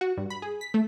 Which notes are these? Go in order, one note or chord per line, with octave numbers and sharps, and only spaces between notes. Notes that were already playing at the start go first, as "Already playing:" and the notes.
F#4
G2
B5
G#4
B6
A3